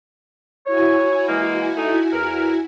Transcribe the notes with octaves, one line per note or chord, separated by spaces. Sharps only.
E4 F#4 C#5 G#5
E3 G#3 A#3
A3 D#4
E2 A#4